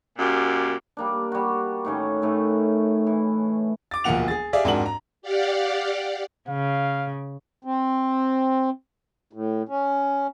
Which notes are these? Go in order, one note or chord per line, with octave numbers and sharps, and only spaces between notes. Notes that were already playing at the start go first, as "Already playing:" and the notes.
F#2 A#2 G4
G3 A#3 D4
G3 F#4
A2 D#3 C#4
A2 D#3 A3 C#4
E3
D6 A6
E1 D2 F3 A#3 F#5 F7
G#4 A6
G4 G#4 D5 E5 F5
F2 G#2 D4 F#4 A#4 F#7
A#5
G4 D5 F5 F#5
C#3 F5
C4
A2
C#4